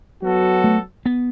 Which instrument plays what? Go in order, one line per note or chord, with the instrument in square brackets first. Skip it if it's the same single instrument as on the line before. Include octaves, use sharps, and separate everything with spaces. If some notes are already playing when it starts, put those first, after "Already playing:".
[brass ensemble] F#3 B3 F#4 A4
[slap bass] A3
B3